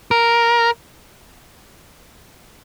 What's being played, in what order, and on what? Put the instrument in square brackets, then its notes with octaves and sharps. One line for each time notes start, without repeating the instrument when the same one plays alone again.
[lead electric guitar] A#4